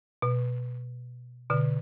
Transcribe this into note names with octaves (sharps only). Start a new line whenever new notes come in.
B2
B2 D3